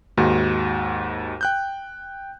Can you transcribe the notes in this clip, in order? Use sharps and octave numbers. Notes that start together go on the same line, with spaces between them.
D#2 G#2 F#4 F#5
G5 F#6 G6